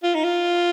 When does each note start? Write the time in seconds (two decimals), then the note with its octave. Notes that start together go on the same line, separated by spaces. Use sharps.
0.03 F4
0.15 D#4
0.24 F4